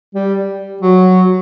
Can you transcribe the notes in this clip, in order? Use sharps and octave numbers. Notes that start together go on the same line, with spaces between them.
G3
F#3